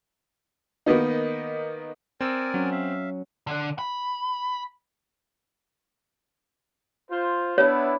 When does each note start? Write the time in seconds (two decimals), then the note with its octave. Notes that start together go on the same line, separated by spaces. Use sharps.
0.86 D#3 A#3 B3 D#4
2.21 C4 A#4 D5 G#5 E6
2.54 F#3 C#4
2.72 E5 F5
3.47 D3 D4
3.79 B5
7.11 F4 C5
7.58 B3 D4 E4 C#5